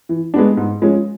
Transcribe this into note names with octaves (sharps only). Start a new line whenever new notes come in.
E3
G#3 B3 D4
G#2
F3 G#3 C#4